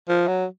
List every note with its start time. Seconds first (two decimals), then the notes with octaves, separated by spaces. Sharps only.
0.09 F3
0.28 F#3